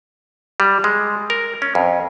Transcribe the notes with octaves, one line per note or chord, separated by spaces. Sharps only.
G3
G#3
A#4
C#4
F2